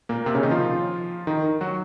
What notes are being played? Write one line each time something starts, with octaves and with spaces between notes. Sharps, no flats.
A#2 A#3
C3 C4
C#3 C#4
D#3 D#4
F3 F4
D#3 D#4
F#3 F#4